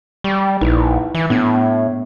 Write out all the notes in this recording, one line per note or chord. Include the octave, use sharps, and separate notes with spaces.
G3 C#6
A#1 D#4 E4 B4
E3 C#7
A2 B3 D4 G#6